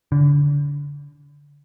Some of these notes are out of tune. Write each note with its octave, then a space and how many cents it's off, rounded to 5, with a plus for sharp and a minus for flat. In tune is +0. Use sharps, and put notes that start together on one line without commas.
D3 -30